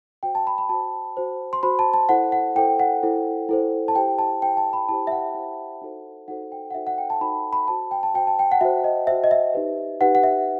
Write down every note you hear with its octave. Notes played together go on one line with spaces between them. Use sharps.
F#4 C5 G5
A5
B5
B5
F#4 C5 A5
F#4 C5
C6
F#4 C5 B5
A5
A5
E4 A4 C5 F#5
F#5
E4 A4 C5 G5
F#5
E4 A4 C5
E4 A4 C5
A5
E4 G4 C5 G5
A5
E4 G4 C5 G5
A5
B5
E4 G4 C5 A5
E5
F#5
E4 G4 C5
D#4 F#4 A4 C5
D#4 F#4 A4 C5 F#5
G5
F#5
D#4 F#4 A4 C5 E5
F#5
G5
A5
D#4 F#4 A4 C5 B5
B5
F#4 C5 A5
G5
A5
F#4 C5 G5
A5
G5
F#5
F#4 C5 E5
D#5
F#4 C5 E5
D#5
E5
D#4 G4 B4
D#4 G4 B4 F#5
F#5
E5